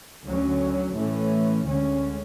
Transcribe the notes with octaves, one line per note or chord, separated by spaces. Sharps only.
D2 D3 F#3 C#4
A2 E3 A3 C#4
D2 D3 G#3 C#4